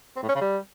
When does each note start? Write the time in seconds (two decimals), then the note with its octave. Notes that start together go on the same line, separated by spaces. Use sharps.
0.16 C4
0.22 A2
0.29 C#4
0.35 C#3
0.41 G3